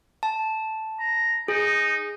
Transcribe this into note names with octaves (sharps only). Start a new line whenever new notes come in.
A5
A#5
D#4 G#4